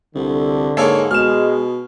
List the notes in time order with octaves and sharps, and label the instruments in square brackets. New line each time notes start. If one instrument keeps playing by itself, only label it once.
[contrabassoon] C2 [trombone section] D3
[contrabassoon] G#2 [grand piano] A#3 A4 C#5
[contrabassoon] B2 [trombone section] G#3 [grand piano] F6 E7